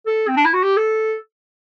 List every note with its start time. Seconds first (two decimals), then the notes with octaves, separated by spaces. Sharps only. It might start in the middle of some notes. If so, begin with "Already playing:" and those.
0.06 A4
0.28 C4
0.37 D4
0.45 E4
0.54 F#4
0.63 G4
0.77 A4